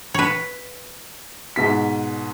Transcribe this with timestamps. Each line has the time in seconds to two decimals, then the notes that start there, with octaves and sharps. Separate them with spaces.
0.14 B4 C#5
1.56 G#2 B2 B6